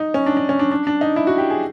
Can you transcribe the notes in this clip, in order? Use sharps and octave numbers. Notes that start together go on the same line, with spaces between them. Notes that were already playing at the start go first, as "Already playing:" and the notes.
Already playing: D#4
C#4
D4
D4
C#4
D4
D4
D4
D#4
E4
F#4
G4
G#4